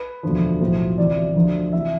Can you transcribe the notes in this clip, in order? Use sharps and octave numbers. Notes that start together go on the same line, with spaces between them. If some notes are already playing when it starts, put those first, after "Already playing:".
Already playing: B4
E1 D2 D3 F3
B1 A2 F3 C5
D2 C3 E3 D5
D2 D3 F3
C3 E3 E5